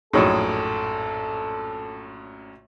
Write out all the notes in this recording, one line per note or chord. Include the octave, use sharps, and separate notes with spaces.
A#1 F#2 A2 D#4 G#4 A4 C#5